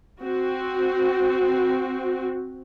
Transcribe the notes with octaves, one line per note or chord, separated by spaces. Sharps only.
C4 F#4